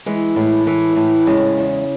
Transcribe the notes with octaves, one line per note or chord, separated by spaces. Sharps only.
E3 G#3
A2
E3
A2
C#3 G#3
E2